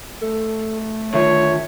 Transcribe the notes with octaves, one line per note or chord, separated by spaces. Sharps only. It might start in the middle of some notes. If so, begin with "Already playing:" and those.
A3 A4
D3 D#3 F4 C#5 E5